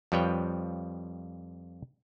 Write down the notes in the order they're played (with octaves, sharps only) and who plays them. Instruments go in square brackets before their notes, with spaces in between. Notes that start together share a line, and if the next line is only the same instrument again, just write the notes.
[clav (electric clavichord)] F2 F3 G3 B4 C#5 G5